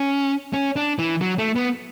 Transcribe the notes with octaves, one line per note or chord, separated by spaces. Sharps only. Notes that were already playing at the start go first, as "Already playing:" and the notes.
Already playing: C#4
C#4
D4
E3
F#3
A3
B3